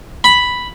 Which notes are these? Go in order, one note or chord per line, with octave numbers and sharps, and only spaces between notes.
B5